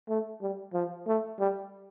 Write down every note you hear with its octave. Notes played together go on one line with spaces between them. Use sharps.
A3
G3
F3
A3
G3